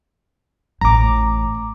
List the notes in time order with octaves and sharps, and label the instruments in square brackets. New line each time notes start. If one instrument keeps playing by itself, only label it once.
[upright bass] A1 A2 [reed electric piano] A#5 D6